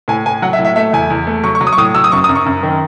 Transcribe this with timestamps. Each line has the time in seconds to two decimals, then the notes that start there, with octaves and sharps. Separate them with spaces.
0.08 A2 G#5
0.26 A2 G#5
0.42 F#3 F#5
0.53 E5
0.59 A2
0.65 E5
0.76 A3 E5
0.93 E2 G#5
1.10 E2
1.27 A3
1.44 F#3 C#6
1.55 C#6
1.61 F#3
1.67 D#6
1.73 C#6
1.78 A2 D#6
1.95 F#3 E6
2.04 D#6
2.12 F#2 C#6
2.24 D#6
2.29 F#2
2.35 C#6
2.46 F#2
2.63 D#3